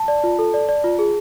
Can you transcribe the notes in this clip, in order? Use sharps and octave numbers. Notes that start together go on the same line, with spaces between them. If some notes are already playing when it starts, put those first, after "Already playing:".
Already playing: A5
D5
F4
A4
D5
D5
F4
G#4